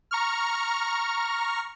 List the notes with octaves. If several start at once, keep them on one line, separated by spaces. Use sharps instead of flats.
A#5 C#6 F6